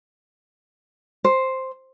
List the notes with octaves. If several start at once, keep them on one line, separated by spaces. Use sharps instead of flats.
C5